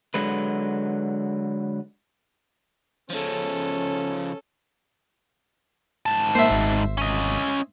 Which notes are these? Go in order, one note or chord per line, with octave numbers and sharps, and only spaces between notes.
D3 F#3 G#3 B4
C#3 F3 C#4 A4
G#2 A5
A#3 C5 E5
G#1
C#4 D#5